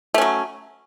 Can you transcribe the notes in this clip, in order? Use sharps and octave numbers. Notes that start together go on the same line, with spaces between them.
F#3 A3 C#4